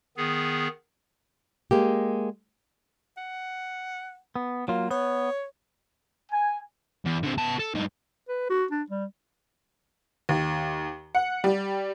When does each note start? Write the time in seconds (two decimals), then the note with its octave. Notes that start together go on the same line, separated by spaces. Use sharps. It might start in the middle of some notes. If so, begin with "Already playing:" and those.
0.17 D#3 B3 G#4
1.71 G#3 A#3 G4
3.17 F#5
4.36 B3
4.68 F#3 A#3 F4
4.91 B3 C#5
6.32 G#5
7.05 E2
7.23 D3 C4
7.38 B3 A5
7.59 A4
7.75 G2 D#4
8.28 B4
8.50 F#4
8.71 D4
8.90 G3
10.29 D#2
11.15 F#5
11.44 G3